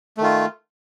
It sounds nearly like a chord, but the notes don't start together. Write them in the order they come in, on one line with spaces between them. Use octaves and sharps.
A3 D#3 F4